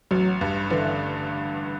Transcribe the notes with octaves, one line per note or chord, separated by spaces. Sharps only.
A1 F#3
G2
D3 E3